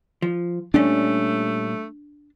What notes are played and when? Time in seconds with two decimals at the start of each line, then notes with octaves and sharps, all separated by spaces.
0.22 F3
0.74 A#2 G3 A3 C#4 D4